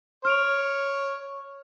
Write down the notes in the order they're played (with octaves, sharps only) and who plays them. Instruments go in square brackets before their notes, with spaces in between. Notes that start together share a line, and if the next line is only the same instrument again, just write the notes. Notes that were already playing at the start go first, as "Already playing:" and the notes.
[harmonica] C#5 [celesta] F6 D7 F7